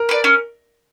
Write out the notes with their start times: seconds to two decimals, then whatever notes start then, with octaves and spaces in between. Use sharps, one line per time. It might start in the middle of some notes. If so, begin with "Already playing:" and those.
Already playing: A#4
0.09 B4 D5
0.24 C#4